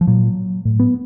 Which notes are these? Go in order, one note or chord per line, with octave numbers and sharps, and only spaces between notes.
F3
A#2 F#3
A2
B3